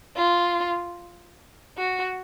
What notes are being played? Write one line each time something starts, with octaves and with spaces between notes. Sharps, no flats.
F4
F#4